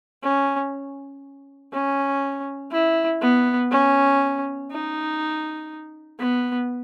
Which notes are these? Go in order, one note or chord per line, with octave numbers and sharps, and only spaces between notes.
C#4
C#4
E4
B3
C#4
D#4
B3